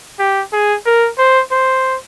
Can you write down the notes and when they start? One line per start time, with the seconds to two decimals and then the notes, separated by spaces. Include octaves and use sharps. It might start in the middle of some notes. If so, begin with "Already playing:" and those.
0.19 G4
0.53 G#4
0.86 A#4
1.18 C5
1.51 C5